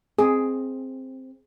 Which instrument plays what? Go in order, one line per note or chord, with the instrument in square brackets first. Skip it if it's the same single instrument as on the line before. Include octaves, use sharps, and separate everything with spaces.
[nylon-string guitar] C4 [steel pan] G#4